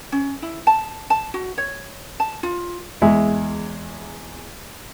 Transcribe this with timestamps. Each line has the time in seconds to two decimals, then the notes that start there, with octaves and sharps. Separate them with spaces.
0.12 C#4
0.42 E4
0.67 A5
1.10 A5
1.34 F#4
1.58 C#5
2.20 A5
2.43 F4
3.02 E2 G#3 E5